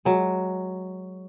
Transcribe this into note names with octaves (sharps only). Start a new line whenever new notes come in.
F#3 G#3